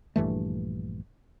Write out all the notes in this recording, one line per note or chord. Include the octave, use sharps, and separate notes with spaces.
A#1 G2 E3 A3